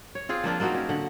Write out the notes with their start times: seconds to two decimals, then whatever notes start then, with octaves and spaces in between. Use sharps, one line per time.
0.15 C#5
0.29 C4 F4 G#4
0.44 F3 A#3 D4 F4
0.60 A#3 C4 D#4 F#4
0.75 C#4
0.89 D3 F#5